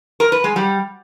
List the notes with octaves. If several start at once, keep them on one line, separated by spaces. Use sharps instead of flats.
A#4
B4
G#3
G3